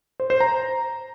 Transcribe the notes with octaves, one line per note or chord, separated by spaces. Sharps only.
C5
C5
A#5